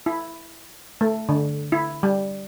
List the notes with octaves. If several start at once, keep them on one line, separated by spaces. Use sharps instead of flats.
E4
A3
D3
E4
G3